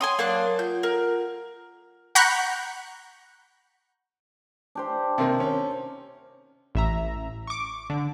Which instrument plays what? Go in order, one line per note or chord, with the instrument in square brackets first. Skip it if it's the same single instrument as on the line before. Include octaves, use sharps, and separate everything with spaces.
[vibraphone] C#5 F#5 [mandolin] G#5 C6 D#6
[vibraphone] F#3 A#4 C#5 [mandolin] A#3 D4 F#6
[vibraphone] F4 F#5 [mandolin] G6
[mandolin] A#4
[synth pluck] F#5 A#5 B5 C#6 F#6 G6
[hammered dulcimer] D4 G4 C5
[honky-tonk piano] C3 D#3 A#3
C#4
[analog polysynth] A1 E5 A#5
C#6 D6
D3